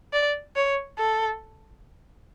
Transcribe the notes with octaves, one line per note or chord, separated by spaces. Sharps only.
D5
C#5
A4